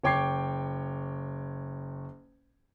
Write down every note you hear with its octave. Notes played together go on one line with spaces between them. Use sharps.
F#1 C#5 G5 D6 G#6 C7